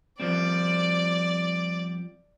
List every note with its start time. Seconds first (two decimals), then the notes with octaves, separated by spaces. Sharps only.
0.20 F3 G3 C4 D5